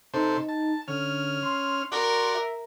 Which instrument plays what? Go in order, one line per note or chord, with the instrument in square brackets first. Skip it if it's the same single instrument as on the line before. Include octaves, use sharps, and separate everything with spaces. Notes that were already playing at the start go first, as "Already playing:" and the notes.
[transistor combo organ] C3 A4 C5 [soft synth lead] D#4
[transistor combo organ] A5
[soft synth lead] D3 [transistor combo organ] C#4 F6
[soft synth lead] C6
[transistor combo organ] F#4 D5 [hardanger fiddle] A#4
[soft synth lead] E5